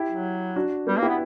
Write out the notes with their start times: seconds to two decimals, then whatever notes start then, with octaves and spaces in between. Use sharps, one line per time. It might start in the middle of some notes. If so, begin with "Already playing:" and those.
Already playing: E4 G4
0.09 F#3
0.56 D4 F#4
0.87 G3 B3
0.97 A#3
1.02 E4 G4
1.08 B3